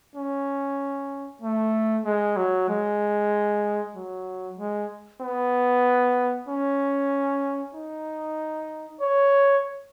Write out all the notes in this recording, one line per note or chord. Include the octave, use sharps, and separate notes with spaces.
C#4
A3
G#3
F#3
G#3
F#3
G#3
B3
C#4
D#4
C#5